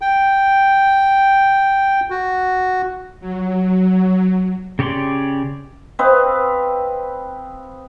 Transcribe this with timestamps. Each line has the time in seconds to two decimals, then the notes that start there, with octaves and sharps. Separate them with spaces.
0.01 G5
2.10 F#4
3.20 F#3
4.79 C#3 G4 C#5 D5 C6
5.99 C4 B4 D#5 F5